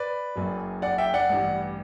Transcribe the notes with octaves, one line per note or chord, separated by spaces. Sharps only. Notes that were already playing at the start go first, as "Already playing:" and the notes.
Already playing: B4 D5
F#1 F#2 F#3
D5 F#5
E5 G5
D5 F#5
A1 G2 E3 G3